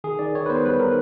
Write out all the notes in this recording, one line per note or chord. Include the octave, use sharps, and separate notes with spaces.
D#3 G#4
D#3 D5
D#3 C#5
B4
B3 C5
G3 B4
D#3 A#4